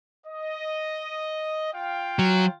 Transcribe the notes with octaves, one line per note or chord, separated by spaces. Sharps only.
D#5
F4 F5 G5
F#3